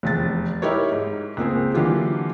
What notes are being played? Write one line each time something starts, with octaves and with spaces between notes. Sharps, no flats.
F1 E2 A6
D#4 E4 G4 A#4 C#5
G#2
C#2 A#3 C4 G#4
D3 E3 F#3 A#3 F4 G4